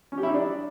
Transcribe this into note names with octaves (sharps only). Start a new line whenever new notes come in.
C#4
G4
E4
D#4
D4